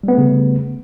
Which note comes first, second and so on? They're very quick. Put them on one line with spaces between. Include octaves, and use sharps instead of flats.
G3 B3 A3 C#3